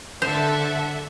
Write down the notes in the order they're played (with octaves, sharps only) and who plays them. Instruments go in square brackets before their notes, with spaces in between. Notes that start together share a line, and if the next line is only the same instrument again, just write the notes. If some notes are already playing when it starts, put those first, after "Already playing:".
[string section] D3 [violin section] A4 D5 E5 [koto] C5 [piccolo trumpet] F#5